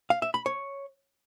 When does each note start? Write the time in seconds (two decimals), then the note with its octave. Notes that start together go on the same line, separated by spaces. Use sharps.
0.10 F5
0.22 E5
0.34 B5
0.46 C#5